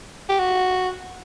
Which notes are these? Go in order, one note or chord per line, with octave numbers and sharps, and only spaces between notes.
G4
F#4